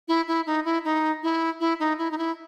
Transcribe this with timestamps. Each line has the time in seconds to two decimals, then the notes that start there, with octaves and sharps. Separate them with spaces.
0.08 E4
0.28 E4
0.47 D#4
0.65 E4
0.85 D#4
1.23 E4
1.60 E4
1.80 D#4
1.98 E4
2.11 D#4
2.18 E4